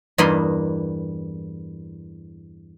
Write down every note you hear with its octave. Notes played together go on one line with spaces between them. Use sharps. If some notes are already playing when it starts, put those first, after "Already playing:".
E2 G2 A#3 D#5 B5 C6